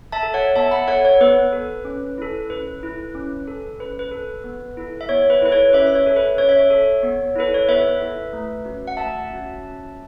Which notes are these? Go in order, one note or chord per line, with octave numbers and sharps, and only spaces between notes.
E5 A5
A4
C#5 F#5
B3 E5 A5
F#5 B5
A4 C#5 F#5
C#5
B3 B4
A4
C#4
E4 A4
C#4 B4
E4 A4
C#4
A4
C#4 B4
B4
A4
B3
E4 A4
E5
B3 C#5
B4
E4 A4 B4
C#5
C#4 B4 E5
E5
C#5
A4
B4
C#4 C#5
E5
C#5
A4
B3
E4 A4 B4
C#5
B3 B4 E5
E4 A4
A3
C#4 F#4
F#5
A3 E5 A5
C#4 F#4
C#4